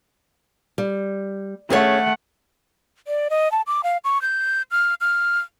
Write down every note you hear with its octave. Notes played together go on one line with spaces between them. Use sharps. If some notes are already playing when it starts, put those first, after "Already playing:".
G3
A3 C#4 G#4 C#5 F#5
D5
D#5
A5
D6
F5
C#6
G6
F6
F6